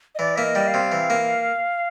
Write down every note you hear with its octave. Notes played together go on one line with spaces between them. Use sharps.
D#5
E3 D5
A#3 E5
D#5
G3
F5
C3
E3
A#3